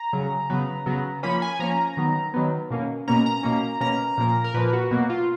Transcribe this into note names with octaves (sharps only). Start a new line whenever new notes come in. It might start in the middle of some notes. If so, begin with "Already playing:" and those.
Already playing: A#5
C#3 F#3 C#4
C#3 F#3 B3
C#3 F#3 B3
F3 A#3 C#4 B5
G#5
F3 A#3 C#4 A#5
D#3 F#3 B3
D#3 F#3 B3
B2 A#3 C#4
B2 A#3 C#4 A#5
A#5
B2 A#3 C#4
B2 A#3 C#4 A#5
A#2 F3 A#3
A#4
A#2 F3 A#3 B4
F#4
B2 F#3 A#3 F#4
F4